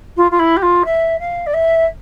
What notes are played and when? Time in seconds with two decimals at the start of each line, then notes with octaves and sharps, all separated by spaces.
0.17 F4
0.31 F4
0.39 E4
0.57 G4
0.62 F4
0.85 E5
1.19 F5
1.47 D5
1.54 E5